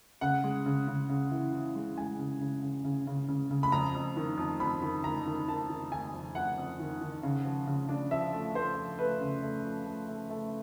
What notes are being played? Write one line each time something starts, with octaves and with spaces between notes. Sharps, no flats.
C#3 F#5
G#3
C#3
C#3
C#3
E3
E3
G#3
G#3 G#5
C#3
C#3
C#3
C#3
C#3
C#3
C#3
B5
F2 A#5
F2
D#3
F2
F2 B5
D#3
D#3 A#5
D#3
D#3 A5
D#3
D#3 G#5
F2
F2 F#5
F2
D#3
D#3
C#3
F3
C#3
D4
F3 E5
A3
A3 C5
F3
A3 B4
C#3
A3
F3
A3
A3
A3